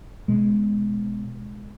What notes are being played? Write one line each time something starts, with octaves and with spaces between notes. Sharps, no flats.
B2 G#3